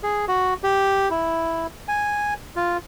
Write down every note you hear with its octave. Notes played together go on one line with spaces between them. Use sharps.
G#4
F#4
G4
E4
G#5
F4